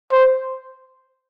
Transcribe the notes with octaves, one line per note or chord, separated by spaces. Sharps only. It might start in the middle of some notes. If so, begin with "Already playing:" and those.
C5